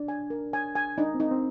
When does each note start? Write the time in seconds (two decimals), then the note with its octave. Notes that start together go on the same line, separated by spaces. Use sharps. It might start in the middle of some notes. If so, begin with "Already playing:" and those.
Already playing: D4 D5
0.08 G#5
0.30 A#4
0.53 G#5
0.75 G#5
0.98 D4 D#4
1.15 C4
1.20 D#4
1.31 C4